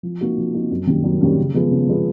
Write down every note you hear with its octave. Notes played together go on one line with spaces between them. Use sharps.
F3
A#3 D#4 F#4
F3
A#3 D#4 F#4
F#2
D#3 G3 A#3 C#4
F#2
D#3 G3 A#3 C#4
C#3
F3 G#3 B3
C#3
F3 G#3 B3